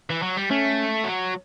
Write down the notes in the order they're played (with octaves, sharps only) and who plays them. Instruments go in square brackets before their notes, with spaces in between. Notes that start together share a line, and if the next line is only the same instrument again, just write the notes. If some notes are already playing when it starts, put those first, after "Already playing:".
[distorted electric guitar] E3
F#3
G3
[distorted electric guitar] A3 [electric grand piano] C#4
[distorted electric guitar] F#3